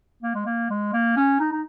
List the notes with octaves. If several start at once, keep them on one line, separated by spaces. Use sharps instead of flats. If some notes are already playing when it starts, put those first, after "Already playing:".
A#3
G#3
A#3
G#3
A#3
C#4
D#4
D#4